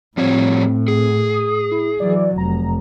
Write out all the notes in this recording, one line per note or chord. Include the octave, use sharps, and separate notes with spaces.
A2 F3 G3 C4 C#5
G#4
D#6
E4
E3 F#3 D5
F1 A#5